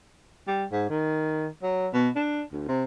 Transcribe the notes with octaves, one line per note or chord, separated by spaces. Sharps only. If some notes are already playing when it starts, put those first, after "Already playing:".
G3
G#2
D#3
F#3
B2
D4
D2
C3